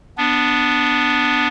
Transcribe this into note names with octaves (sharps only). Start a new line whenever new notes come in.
B3 D4